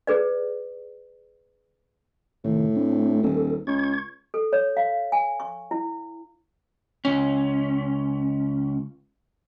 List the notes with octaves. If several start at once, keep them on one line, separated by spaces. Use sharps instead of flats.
G#4 B4 D5
A2 C3 D#3
A3 C4 D4
D#1 A4
C#2 C#6 G#6
A4
C#5
F5
G#5
C#6
E4
C#2 C#4